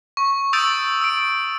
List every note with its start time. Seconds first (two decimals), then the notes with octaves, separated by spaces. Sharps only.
0.17 C#6
0.53 C#6 D#6 E6 G6 A6 D7
1.01 E6 D7